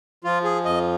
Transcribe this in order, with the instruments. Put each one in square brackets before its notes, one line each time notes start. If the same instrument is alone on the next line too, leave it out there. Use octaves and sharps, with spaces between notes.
[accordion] F3 F4
G#4
F2 D#5